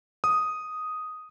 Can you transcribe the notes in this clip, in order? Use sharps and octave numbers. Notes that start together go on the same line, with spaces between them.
D#6